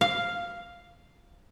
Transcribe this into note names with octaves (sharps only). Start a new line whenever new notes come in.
F5